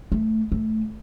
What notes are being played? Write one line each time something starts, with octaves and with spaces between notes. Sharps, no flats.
A3
A3